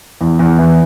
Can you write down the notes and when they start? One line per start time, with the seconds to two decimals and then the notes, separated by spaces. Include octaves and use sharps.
0.21 E2
0.39 E2
0.59 E3